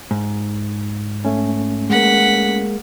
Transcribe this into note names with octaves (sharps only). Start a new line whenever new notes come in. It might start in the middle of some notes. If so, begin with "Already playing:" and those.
G#2
A3 C#4
G#3 A#3 F#5 B6